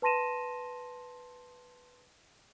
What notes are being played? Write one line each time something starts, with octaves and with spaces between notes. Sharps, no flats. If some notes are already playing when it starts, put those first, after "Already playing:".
B4 A5 C6 A#6 D#7 E7